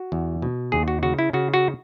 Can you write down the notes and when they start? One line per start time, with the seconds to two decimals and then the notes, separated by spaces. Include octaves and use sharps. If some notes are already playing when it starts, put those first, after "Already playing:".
Already playing: F#4
0.12 E2
0.42 B2
0.72 D#2 G#4
0.88 F#4
1.03 C#3 F#4
1.19 E4
1.33 C#3 F#4
1.54 F#4